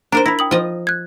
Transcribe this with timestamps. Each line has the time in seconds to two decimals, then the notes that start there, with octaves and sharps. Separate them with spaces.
0.12 D4 A#4 C5 A#5
0.26 E4 B5 A#6
0.39 G5 D#6 F#7
0.51 F3 D#5
0.87 F#6 G#6